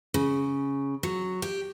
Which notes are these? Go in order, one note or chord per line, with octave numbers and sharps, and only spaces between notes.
C#3
F#3
G4